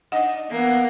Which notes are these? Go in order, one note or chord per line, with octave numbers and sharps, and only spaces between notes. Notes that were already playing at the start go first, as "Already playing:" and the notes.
D4 D#4 D#5 F#5
E3 A#3 B3